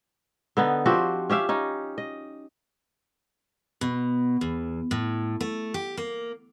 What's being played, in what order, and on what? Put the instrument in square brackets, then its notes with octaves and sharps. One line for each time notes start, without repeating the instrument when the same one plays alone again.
[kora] D3 B3 D#4
F3 C4 F#4 G4
C#4 G4 E5 F5
C#4 D#4 D#5
D#5
[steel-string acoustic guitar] B2
E2
A2
A3
G4
A#3